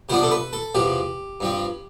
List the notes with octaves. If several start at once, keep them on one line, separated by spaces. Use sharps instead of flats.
C3 F3 B3 D4 C5
A4
B4
A4
E2 C3 F3 G4
G2 F3 C4